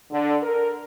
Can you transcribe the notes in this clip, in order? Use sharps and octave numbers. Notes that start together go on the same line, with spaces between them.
D3
A#4